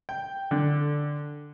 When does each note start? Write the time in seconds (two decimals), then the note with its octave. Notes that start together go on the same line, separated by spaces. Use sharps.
0.09 G5
0.51 D3